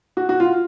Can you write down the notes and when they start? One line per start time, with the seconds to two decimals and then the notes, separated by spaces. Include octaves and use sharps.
0.17 F#4
0.29 F#4
0.40 F4